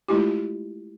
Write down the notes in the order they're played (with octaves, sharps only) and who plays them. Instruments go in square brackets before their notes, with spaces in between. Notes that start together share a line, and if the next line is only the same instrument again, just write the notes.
[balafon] G#3 A3 E4 F4 G4